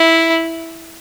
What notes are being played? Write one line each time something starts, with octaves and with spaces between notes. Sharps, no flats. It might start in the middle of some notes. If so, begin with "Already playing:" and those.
Already playing: E4